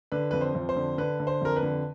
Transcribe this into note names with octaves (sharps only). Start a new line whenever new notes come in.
D3 B4
F2 B4
C5
F2
C5
D3
D3 B4
D3
C5
F2 A#4
B4
D3